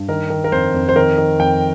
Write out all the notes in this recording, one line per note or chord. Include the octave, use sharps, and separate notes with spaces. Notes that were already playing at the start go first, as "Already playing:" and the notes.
Already playing: G2
D#3 A#4
D#3
A#4
F2 C5
F2
C5
D#3 A#4
D#3
F2 G5